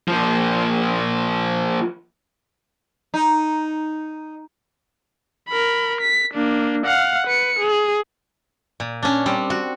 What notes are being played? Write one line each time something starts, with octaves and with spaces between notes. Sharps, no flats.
F3 A#3
D#4
A#4 B5
B6
A#3 D4
F5 F#5
B4 C#7
G#4
A#2
C#4 D4
G3 C4
F#4